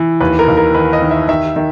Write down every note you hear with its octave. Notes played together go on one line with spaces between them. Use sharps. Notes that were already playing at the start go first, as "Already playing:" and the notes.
Already playing: E3
D#2 B4
A#4
D#2
A#4
D#3 B4
D#5
D#3
E5
D#3 E5
D#3